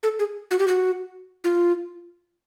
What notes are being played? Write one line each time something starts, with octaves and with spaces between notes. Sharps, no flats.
A4
G#4
F#4
G4
F#4
F4